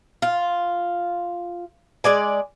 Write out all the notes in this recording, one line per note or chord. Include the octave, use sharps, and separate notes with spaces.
F4
G#3 D5 G#5